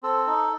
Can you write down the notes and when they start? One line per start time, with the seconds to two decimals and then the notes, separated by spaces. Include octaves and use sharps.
0.03 C4 A4
0.27 D#4